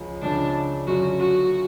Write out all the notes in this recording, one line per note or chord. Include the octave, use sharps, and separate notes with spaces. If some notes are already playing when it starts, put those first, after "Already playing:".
Already playing: C#2 C#3 F3
C#2 C#3 F3 D4
F#2 D3 F#3 C#4 F4 F#4
F#4